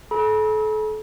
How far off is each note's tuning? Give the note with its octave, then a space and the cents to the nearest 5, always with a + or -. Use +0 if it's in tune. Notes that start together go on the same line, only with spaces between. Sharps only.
A4 -35 B5 -40